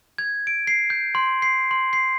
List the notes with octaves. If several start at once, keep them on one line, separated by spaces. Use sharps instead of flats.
G#6
D7
C7
G6
C6
C7
C6
C7